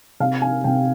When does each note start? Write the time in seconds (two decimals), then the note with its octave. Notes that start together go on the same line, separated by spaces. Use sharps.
0.20 C3 F5
0.42 G#5
0.64 C3 G5